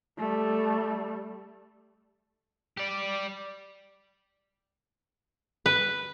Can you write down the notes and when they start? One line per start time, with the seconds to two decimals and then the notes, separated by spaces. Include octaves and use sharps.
0.18 G3 A3
2.77 G4 D5
5.66 B4